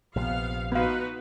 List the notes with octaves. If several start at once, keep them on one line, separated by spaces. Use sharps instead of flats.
A#1 C3 F3 B3 F5
B3 D#4 F#4 B4 F5